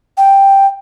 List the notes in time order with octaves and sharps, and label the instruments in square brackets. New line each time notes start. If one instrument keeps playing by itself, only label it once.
[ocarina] G5